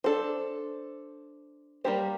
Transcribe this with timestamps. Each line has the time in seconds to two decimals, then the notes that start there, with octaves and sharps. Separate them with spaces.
0.04 D4 A4 C5
1.84 G3 A#3 E4 G4 C5